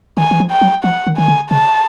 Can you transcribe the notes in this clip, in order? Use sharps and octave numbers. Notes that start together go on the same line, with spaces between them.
D#3 G#5
E3
F3
G5
F#3
F3 F#5
D#3
D#3 G#5
D3
C#3 A5